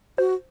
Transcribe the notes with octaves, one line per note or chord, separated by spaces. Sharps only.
F#4 C5